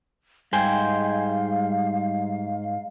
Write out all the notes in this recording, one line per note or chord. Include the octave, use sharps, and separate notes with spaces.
G#2 G3 C5 F5 G5 G#5